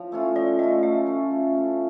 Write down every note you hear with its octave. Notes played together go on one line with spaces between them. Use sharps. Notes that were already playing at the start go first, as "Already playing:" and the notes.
Already playing: F3 C#5
A3 C#4 F4
F3 D5
A3 C#4 F4 D#5
A3 E5
C#4 F4
A3
C#4 F4